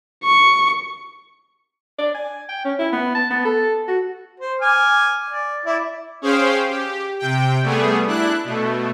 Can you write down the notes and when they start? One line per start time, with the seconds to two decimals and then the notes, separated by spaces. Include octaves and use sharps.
0.24 C#6
1.99 D5
2.15 G#5
2.49 G5
2.65 C#4
2.79 E4
2.93 B3
3.15 A5
3.31 B3
3.45 A4
3.88 F#4
4.40 C5
4.61 G#5 D6 F6
5.30 D5
5.66 E4 D5
6.22 C#4 G#4 C5 F5 G5
6.68 G4
7.19 C3 G5
7.62 G3 A3 B3 G#4
8.07 D4 E4 F#6
8.44 B2 A3